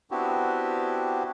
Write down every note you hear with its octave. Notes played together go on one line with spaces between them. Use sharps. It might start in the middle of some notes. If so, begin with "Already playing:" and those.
B3 C4 D4 E4 F#4 G4